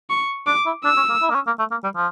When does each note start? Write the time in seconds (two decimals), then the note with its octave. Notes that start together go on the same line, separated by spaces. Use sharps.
0.10 C#6
0.47 D4 D6
0.66 E4
0.84 D4 E6
0.96 C#4
1.09 A#3
1.22 E4
1.30 A#3
1.35 C#4
1.47 A#3
1.59 A3
1.71 A#3
1.83 G3
1.96 F3